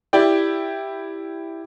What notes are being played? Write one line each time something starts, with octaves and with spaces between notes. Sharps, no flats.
E4 G4 D5 G5